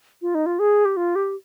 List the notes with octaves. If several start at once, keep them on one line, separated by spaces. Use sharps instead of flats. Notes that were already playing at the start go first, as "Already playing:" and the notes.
F4
D#4
F4
G#4
G4
F4
G4